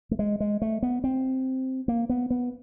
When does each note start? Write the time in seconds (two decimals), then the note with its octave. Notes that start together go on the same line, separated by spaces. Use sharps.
0.11 A3
0.19 G#3
0.40 G#3
0.62 A3
0.83 B3
1.04 C4
1.88 A#3
2.09 B3
2.30 B3